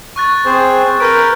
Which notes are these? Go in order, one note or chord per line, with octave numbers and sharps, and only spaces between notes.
C#6 F#6 A6
C4 G#4 C5
A#4 B4 F6 G6 D7